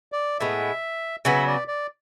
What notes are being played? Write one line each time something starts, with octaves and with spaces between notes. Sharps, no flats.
D5
A2 G#3 B3 E5
C#3 F#3 B3 E5
D5
D5